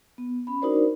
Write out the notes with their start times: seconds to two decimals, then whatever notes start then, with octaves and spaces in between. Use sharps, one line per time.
0.18 B3
0.47 C#4 B5
0.62 D4 D#4 F#4 A#4 C5 D5